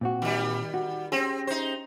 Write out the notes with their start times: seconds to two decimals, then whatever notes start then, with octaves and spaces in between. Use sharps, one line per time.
0.01 A#2 C4 F#4
0.22 D#3 G3
0.74 F#4
1.12 C4 C#4 G4 G#4
1.47 D#4 C5